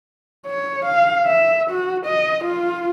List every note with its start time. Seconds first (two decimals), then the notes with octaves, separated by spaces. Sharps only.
0.46 C#5
0.85 F5
1.26 E5
1.71 F#4
2.06 D#5
2.45 F4